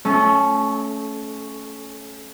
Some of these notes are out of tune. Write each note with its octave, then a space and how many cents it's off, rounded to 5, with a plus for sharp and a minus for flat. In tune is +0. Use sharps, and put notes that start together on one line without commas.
A3 +0 C#4 +0 A4 -30